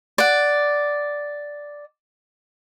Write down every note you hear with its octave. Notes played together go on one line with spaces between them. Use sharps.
D5 F#5